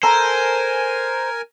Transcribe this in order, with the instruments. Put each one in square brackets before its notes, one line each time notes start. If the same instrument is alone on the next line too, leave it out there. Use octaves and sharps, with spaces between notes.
[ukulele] A4 A#5 [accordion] A#4 G#5 [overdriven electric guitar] C5